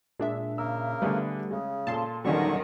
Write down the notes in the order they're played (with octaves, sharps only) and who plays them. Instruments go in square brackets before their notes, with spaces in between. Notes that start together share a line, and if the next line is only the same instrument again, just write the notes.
[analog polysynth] A#2 D4 E5 [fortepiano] G#3
[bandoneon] C#3 A#3 A#4 [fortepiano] E6
[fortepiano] D3 G#4 B4 [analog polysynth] G3 A3 B3
[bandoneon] C#3 [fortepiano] G#3
[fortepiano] A#2 A4 [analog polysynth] A5 C6
[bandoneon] E2 D3 C#6 [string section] D#3 [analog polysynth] F#3 G3 C#4